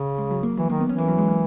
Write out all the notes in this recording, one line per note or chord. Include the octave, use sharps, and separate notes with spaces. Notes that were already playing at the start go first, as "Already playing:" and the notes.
Already playing: C#3
G#3
F#3
A#3
E3 F#3
D#3 A#3
B3
E3 C#4
A#3
F#3
G#3
A#3